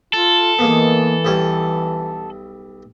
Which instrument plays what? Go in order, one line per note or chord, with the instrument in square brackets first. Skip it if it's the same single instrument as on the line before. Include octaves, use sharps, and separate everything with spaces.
[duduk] F4 [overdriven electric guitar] A4
[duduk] E3 [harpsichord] G#3 A#3 B3
[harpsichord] B1 G3 C#5